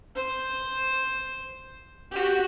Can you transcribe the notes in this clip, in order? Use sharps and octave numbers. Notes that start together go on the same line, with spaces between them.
C5
F#4 G4